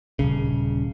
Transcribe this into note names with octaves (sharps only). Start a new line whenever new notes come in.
D#1 G#1 C#3